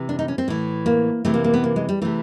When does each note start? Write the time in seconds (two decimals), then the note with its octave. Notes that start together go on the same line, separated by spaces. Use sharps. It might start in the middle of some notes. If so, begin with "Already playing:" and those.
Already playing: C3 E3
0.09 D4
0.19 D#4
0.28 C#4
0.38 C4
0.48 A2 E3
0.86 A#3
1.25 C3 E3 A3
1.34 A#3
1.44 A#3
1.54 B3
1.64 A#3
1.76 G#3
1.89 G3
2.02 C3 E3 A3